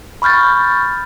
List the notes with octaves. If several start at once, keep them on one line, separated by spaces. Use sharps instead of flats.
B5 C#6 F6 G6 A6